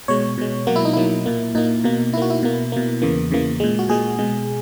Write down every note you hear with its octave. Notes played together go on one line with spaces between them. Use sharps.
B2 G#3 C#5
B2 G#3
B2 F#3 A#3 F#4
E4
D#4
B2 F#3 A#3 E4
A#2 A#3
A#2 A#3 D#4
B2 A#3
B2 A#3 E4 F#4
E4
B2 A#3
B2 A#3
E2 C#3 E3 A#3
E2 C#3 E3 A#3
A#2 G#3
F#4
A#2 G#3 G#4
B2 G#3